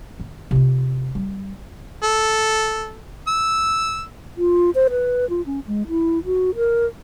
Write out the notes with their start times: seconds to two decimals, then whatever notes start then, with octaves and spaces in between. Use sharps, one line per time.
0.20 D#3
0.51 C3 F4
1.15 G3
2.03 A4
3.28 E6
4.38 F4
4.75 C5
4.90 B4
5.30 F4
5.46 C#4
5.67 G#3
5.88 E4
6.25 F#4
6.56 A#4